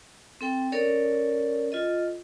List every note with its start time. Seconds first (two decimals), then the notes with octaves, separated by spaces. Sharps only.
0.41 C4 A4 G5
0.72 C#4 A4 A#4 C#5 D5
1.72 F4 A4 D#5